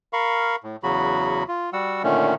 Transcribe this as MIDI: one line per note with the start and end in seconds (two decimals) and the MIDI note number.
0.13 0.56 70
0.13 0.56 77
0.13 0.56 83
0.13 0.56 85
0.63 0.76 45
0.83 1.44 40
0.83 1.44 49
0.83 1.44 54
0.83 1.44 66
0.83 1.44 83
1.48 1.70 65
1.73 2.02 55
1.73 2.02 66
1.73 2.02 78
1.73 2.02 88
2.03 2.34 46
2.03 2.34 50
2.03 2.34 51
2.03 2.34 57
2.03 2.34 61